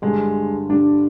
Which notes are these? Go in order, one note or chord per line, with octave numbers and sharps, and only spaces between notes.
G2 D3 G3 G#3
G2 D3 G3 D4